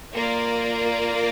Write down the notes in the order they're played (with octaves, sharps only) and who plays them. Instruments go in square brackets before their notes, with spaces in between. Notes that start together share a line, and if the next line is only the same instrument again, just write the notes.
[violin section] A#3 F4 A#4 D5